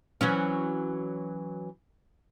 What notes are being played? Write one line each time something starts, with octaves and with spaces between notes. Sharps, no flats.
E3 F#3 C#4